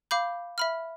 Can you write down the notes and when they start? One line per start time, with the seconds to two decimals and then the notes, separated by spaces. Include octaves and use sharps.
0.11 F5 B5 D6 G6
0.58 E5 B5 F6